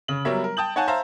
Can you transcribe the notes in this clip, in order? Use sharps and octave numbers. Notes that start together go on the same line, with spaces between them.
C#3 F#7
F#3 G3 B3 A#4 C#5 E5
A#4
G5 A5 D#6 G6 F#7
D#4 C#5 F5 F#5 G#5 A5
C5 E5 F5 A5 A#5